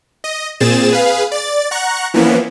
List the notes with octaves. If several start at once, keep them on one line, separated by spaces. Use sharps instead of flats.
D#5
A#2 C4 G#4 A6 E7
G#4 B4 F5
D5 A6
F#5 A#5 C#6 F#6
E3 F3 A#3 B3 C#4 E4